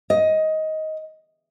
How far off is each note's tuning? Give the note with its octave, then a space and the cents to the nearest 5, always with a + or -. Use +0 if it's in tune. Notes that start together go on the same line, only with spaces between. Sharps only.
D#5 +15